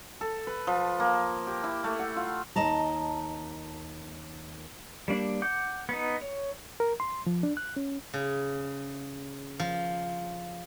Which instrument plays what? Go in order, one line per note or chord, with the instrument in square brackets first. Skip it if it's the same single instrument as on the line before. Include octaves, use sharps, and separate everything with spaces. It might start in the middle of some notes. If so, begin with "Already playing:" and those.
[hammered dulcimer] A4
B4
F3
A#3
G4
E4
A3
F#5
F4
[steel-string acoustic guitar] D#2 D#5 A5 A#5
[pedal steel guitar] G3 A#3 D4
F#5 D6 G6
B3 D#4
C#5
[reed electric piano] A#4
C6
F3
D4
F#6
C#4
[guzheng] C#3
F3